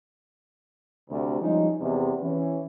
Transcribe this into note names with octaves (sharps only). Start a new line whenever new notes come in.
D2 C3
F3 G3 G#3 C#4 D#4
E2 C3
E3 C#4